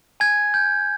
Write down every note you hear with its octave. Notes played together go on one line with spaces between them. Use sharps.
G#5 G#6
G6